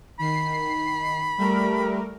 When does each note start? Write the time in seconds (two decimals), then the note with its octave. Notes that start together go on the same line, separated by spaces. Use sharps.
0.19 D#3 B5 C7
1.38 G3 A3 A#4